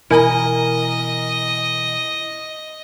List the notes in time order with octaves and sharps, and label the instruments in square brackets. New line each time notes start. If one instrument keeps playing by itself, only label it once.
[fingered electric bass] B2 E3 [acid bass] E4 [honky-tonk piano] A#4 G#5 [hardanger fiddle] D#5